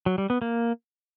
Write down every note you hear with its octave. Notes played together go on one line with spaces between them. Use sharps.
F#3
G3
B3
A#3